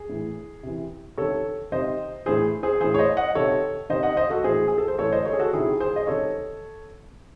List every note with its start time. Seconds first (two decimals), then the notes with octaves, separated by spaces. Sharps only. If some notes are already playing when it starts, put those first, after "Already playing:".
Already playing: G#4
0.09 A2 E3
0.63 C3 E3
1.18 C3 D#3 A4 C#5
1.72 C3 D#3 C5 D#5
2.26 A2 E3 G#4 C5
2.63 G#4 C5
2.81 A2 E3 G#4 C5
2.94 C#5
2.98 C5 D#5
3.17 D#5 F#5
3.35 C3 D#3 A4 C#5
3.89 C3 D#3 C5 D#5
4.03 D#5 F#5
4.17 C5 D#5
4.30 F#4 A4
4.44 A2 E3 G#4 C5
4.68 G#4
4.78 A4
4.88 C5
4.98 A2 E3 A4 C#5
5.12 C5 D#5
5.25 A4 C#5
5.33 G#4
5.39 F#4 A4
5.53 C3 D#3 E4 G#4
5.80 G#4 C5
5.96 D#5
6.07 C3 D#3 A4 C#5